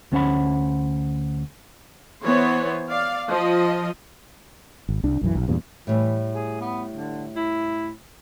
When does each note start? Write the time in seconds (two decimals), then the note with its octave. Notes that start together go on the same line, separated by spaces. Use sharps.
0.12 D2 B3 C#4 C5 F#5 B5
2.22 E3 B3 C5 C#5
2.88 D5 F5
3.29 F3 D#5
4.89 G#1
5.03 C2 D4
5.21 B1 F#2 E3
5.35 B1
5.48 E2 G2 A#2
5.87 A2 E3 G3
6.35 G#4
6.61 B3
6.95 D3
7.36 E4